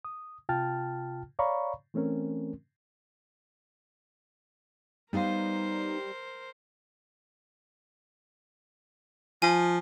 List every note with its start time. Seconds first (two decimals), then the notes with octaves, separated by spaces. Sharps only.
0.05 D#6
0.49 C3 F4 G5 A5 F6 A6
1.39 C#5 D5 F5 A#5 B5 C#6
1.94 E3 A3 C4 C#4 A#4
5.13 G3 B3 D#4 A#4 C5 F5
9.42 F3 G#5